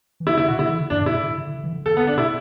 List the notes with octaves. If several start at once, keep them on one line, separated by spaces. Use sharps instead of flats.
E3
D3 E4
D3 E4
B2 F#4
D3 E4
E3
D3
F#2 D4
A2
E4
B2
D3
D3
D3
E3
D3
A4
B3
D4
B2 E4